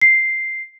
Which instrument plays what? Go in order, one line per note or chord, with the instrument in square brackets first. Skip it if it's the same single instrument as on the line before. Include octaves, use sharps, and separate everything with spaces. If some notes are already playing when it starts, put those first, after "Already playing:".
[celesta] C7